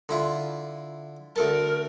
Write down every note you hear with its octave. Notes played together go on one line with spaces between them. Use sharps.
D3 E4 F4
D2 A4 A#4 A5